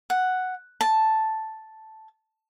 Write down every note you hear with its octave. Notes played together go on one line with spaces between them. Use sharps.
F#5
A5